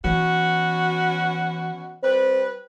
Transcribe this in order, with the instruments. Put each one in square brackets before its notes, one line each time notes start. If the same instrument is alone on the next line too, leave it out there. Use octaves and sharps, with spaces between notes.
[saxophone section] B2 C#4 F#4 [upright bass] E3
[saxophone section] G3 B4 [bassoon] C4